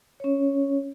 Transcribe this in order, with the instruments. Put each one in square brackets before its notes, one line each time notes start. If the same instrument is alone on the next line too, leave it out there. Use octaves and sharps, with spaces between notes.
[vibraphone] C#4 C#5